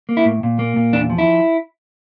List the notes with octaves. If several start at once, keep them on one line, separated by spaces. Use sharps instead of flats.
A#3
E4
A2
A#2
A#3
A#2
E2 D4
F3
E4